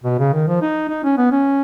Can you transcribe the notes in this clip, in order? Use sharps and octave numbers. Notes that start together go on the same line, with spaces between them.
B2
C#3
D#3
F3
D#4
D#4
C#4
B3
C#4